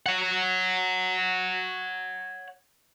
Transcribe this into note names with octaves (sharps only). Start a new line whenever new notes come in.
C#5 F#5